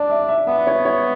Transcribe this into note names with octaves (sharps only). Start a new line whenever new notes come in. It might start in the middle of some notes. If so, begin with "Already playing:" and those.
Already playing: D4 D5
E5
E5
B3 E5
C#5
C#5